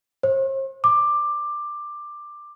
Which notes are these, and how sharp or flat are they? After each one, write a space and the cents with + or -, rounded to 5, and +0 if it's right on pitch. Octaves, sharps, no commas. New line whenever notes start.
C5 +45
D6 +15